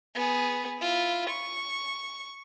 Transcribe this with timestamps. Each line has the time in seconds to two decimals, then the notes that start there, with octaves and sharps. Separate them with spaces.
0.15 B3 G#4
0.80 E4 F4
1.30 C#6